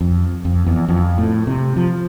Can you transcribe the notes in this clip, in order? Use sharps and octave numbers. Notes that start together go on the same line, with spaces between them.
F2
F2
E2
F2
A2
C3
F3